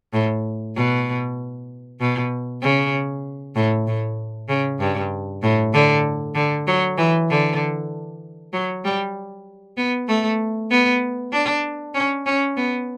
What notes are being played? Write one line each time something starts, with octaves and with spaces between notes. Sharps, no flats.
A2
B2
B2
C#3
A2
A2
C#3
G2
A2
D3
D3
F#3
E3
D3
F#3
G3
B3
A3
B3
D4
C#4
C#4
B3